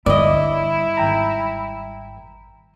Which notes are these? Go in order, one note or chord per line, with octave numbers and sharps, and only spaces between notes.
G1 G3 E4 D5 D#5
G#1 G5 A#5